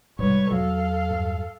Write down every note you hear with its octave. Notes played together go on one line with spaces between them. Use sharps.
G#2 C3 G3 B4 C#5
E2 F#3 A4 F5
G2 G3